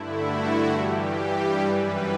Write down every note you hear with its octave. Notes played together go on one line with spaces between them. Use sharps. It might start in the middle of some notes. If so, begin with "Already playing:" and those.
Already playing: G2 D3 A3 E4
F#4
G2 E3 G3 G4
F#2 E3 G3 B4